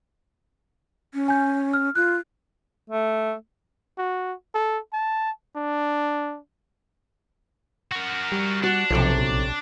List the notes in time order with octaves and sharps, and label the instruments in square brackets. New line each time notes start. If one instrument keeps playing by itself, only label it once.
[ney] C#4
[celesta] G#5 G6
F6
[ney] F4 [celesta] F#6
[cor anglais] A3
[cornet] F#4
A4
A5
D4
[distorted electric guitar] F#4 A#4
[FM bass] G3
[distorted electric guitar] D4 [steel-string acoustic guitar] F#4
[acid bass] B1 [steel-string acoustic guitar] C3 A4 C#5 [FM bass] F3
[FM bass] A#1